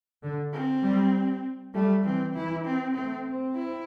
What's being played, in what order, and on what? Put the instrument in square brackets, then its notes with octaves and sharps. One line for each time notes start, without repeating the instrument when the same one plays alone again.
[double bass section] D3
[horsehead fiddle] C4
[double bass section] G3
[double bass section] G3 [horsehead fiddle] A3
[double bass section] E3 [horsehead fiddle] C4
[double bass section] E3 [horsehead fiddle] E4
[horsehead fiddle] C4
[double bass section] A3 [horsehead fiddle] C4
[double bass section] C4
[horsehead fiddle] E4